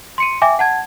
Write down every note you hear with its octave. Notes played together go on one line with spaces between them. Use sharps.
C6 C#7 D#7
E5 G5 G#5 D6
F#5 A5 G#6